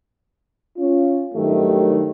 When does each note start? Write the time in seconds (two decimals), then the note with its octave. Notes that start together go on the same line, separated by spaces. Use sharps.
0.77 C#4 F4
1.35 G2 D#3 F#3 A3 G4